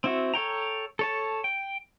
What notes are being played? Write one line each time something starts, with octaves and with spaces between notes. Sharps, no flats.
C4 E4 F#4
A4 C#5 G5 A#5
A4 C#5 A5
G5